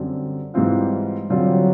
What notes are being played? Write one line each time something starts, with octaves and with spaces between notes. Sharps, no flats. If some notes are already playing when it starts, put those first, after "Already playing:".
Already playing: F#2 D3 G3 C4
G#2 E3 G3 C4 F4
D3 F#3 G3 C4 F4